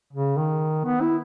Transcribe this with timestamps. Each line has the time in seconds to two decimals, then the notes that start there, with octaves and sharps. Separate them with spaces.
0.13 C#3
0.37 D#3
0.85 B3
1.01 E4